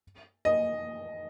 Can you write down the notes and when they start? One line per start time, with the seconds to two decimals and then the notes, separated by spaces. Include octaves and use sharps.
0.45 D#5